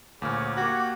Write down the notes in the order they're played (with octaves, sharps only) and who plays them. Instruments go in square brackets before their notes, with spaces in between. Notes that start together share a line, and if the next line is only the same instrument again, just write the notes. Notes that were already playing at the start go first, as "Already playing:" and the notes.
[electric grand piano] D2 A#2 F6 [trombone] C#3 [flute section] F#5 D6 G#6
[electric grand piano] A#3 F#6 [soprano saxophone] F#4 [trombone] G4